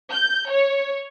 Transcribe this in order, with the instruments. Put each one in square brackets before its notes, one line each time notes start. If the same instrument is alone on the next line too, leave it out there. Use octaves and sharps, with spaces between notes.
[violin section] G6
C#5